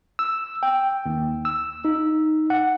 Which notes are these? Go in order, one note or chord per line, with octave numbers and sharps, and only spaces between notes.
E6
G5
D#2
E6
D#4
F#5